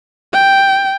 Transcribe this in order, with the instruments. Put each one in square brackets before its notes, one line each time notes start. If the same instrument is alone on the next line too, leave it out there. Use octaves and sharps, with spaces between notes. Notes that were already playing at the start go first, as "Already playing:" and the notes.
[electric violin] G5